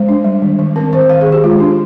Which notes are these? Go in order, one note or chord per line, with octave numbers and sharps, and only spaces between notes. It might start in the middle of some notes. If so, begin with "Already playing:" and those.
Already playing: G#3 C5
D4
G3
D#3
D#3
C4 A#4
D#3 C5
D#3 F5
G#4
D#3
G4
G#3 F4
D4